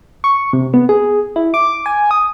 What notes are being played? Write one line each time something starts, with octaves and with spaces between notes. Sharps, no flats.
C#6
C3
B3
G#4
E4
D6
G#5
D#6